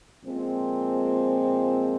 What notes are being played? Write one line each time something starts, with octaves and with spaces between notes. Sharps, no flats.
A#2 F3 G#3 C4